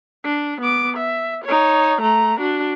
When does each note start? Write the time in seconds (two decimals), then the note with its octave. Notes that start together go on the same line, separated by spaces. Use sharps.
0.25 D4
0.61 B3 D6
0.97 E5
1.44 D#4 C#5
2.02 A3 A#5
2.40 D4 F#4